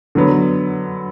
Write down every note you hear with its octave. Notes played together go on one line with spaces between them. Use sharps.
D3 F#3 B3